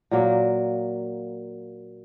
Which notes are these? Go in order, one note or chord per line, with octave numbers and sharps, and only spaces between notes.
A#2 F#3 A#3